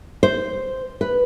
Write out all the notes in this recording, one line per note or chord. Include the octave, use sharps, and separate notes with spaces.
C5
B4